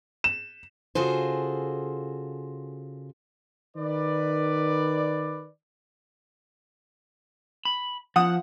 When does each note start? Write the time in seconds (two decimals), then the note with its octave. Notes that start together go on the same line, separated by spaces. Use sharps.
0.24 E7
0.95 C#3 F4 F#4 G#4 A4 C5
3.76 D#3 B4 D5
7.65 B5
8.16 F3 F#5 D#6